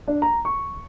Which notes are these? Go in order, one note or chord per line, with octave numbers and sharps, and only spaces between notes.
D4
A#5
C#6